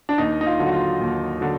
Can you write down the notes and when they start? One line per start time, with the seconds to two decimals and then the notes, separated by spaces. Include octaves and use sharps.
0.09 D4
0.18 D#2 D#4
0.41 D#4
0.46 F4
0.59 D3 F#3
0.66 F#4
0.73 F4
1.01 D#2
1.41 D3 F#3